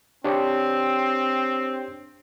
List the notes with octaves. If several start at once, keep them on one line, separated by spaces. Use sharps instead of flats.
C4 D4 G4 C#5